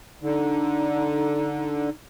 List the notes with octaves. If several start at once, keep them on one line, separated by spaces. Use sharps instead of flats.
D3 D#4